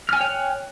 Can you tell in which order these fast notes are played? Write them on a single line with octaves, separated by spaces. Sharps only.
F6 G#5 G5 C#5 F#6